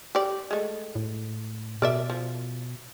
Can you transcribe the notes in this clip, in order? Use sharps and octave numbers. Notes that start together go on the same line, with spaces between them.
G4 D5
G#3 A3
A2
B2 A#4 D5 E5
F3